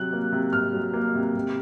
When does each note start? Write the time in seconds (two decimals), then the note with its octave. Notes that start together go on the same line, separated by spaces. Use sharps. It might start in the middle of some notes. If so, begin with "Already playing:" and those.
Already playing: C3 F#3 F#6
0.13 A#3
0.32 C3
0.53 C3 F6
0.73 F#3
0.94 A#3
1.15 C3
1.35 C3